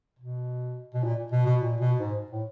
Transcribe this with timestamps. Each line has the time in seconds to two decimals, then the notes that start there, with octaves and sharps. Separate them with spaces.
0.19 B2
0.94 B2
1.04 A#2
1.32 B2
1.46 B2
1.61 A#2
1.80 B2
1.99 G#2
2.32 A2